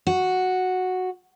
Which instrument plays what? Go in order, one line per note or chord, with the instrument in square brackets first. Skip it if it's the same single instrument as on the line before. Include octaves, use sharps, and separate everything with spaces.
[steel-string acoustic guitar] F#4